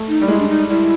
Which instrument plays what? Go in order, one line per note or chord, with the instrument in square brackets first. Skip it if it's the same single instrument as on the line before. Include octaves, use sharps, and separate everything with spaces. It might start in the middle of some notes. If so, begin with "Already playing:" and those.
Already playing: [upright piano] A3
[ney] D#4
[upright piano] G3
[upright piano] G#3 [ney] E4
[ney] D4
D#4
[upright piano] G3 [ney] E4